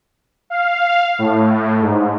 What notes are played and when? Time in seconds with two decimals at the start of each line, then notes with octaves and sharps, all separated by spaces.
0.50 F5
1.19 A2
1.81 G#2